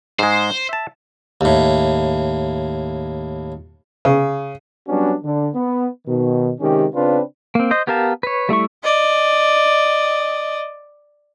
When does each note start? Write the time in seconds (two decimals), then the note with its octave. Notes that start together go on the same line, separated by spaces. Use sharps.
0.19 G#2 G#3 C5
0.69 E5 A5
1.41 D#2 A2
4.05 C#3
4.88 F#3 G3 B3 C#4 D4 F#4
5.24 D3
5.55 B3
6.07 B2 D#3
6.60 C3 D#3 G#3 C#4 G4
6.95 C#3 C4 D4 F4 B4
7.55 A#3 C4
7.71 C5 D#5
7.87 B3 G4 A#4 F5 A5
8.23 B4 C#5
8.49 G3 A3 E4 C#6
8.84 D5 D#5